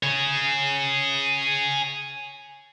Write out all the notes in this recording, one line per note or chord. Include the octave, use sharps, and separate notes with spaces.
G#4 C#5